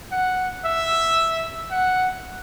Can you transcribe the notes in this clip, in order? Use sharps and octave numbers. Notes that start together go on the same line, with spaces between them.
F#5
E5
F#5